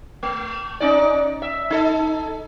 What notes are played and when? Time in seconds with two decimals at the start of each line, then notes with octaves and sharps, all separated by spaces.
0.23 A3
0.80 C#4 D#4 D5
1.42 E5
1.70 D#4 A4